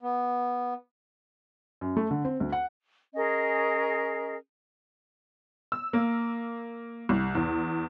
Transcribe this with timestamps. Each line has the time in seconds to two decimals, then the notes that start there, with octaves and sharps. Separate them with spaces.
0.02 B3
1.81 F#2
1.97 A3
2.11 D3
2.25 C4
2.40 D2
2.52 F#5
3.15 C#4 G#4 A#4 D#5
5.72 E6
5.93 A#3
7.09 C2
7.35 E2